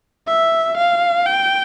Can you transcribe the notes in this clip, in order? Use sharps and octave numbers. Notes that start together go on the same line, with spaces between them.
E5
F5
G5